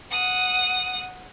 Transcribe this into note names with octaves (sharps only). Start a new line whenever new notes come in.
F#5 D#6